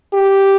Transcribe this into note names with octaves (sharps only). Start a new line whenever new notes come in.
G4